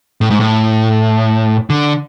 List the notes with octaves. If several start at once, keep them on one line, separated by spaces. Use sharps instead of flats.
A2
G#2
A2
D3